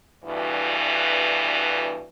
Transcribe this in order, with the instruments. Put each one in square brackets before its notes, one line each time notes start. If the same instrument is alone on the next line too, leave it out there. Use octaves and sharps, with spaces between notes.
[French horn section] D2 G2 B2 E3